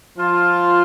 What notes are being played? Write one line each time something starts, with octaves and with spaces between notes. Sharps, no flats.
F3 F4